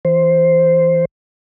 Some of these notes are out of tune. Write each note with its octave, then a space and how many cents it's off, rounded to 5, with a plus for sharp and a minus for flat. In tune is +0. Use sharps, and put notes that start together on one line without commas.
E3 +0 C5 +0